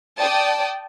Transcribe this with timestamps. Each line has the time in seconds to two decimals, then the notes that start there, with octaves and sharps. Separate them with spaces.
0.17 D5 G5 A5 D#6